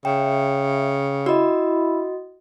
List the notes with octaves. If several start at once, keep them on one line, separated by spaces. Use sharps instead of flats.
C#3 E5 G5
E4 F#4 D#5 E5 B5